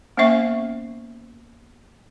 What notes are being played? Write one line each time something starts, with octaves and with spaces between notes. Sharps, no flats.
A#3 B3 C#4 C5 E5 C#6